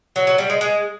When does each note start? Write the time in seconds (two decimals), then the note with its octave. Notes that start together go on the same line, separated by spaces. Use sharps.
0.16 F#3
0.27 F#3
0.38 G3
0.50 G#3
0.61 G#3